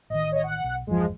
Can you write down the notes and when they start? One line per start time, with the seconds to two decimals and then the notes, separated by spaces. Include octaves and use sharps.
0.10 A1 D#3 D#5
0.32 C#5 D#5
0.44 F#5
0.64 B1
0.87 G1 E2 F3 G#3